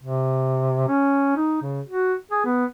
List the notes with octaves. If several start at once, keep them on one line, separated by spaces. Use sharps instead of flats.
C3
C#4
D#4
C#3
F#4
G#4
B3